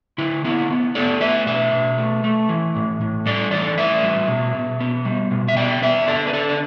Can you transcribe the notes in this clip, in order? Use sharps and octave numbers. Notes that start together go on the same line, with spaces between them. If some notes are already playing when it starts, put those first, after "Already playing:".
D3 E4
B3 E4
B3
A3 A4 D5
A3 B4 E5
B2 B4 E5
B2
A3
A3
E3
A2
A2
G3 A4 D5
E3 A4 D5
A2 B4 E5
G3
B2
B2
B3
G3
B2
E5
B3 D5 G5
B3 B4 E5
D3 A4 D5
B4
D3 A4 D5
D5